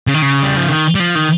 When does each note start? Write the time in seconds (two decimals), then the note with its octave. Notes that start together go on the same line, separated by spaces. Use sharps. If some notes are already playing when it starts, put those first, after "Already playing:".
0.07 C#3
0.14 D#3
0.22 C#3
0.43 G3
0.57 F3
0.68 D#3
0.95 G3
1.00 F3
1.15 D#3